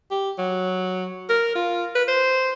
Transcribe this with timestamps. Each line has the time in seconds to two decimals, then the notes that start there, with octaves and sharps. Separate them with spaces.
0.11 G4
0.38 F#3
1.29 A#4
1.55 F4
1.95 B4
2.08 C5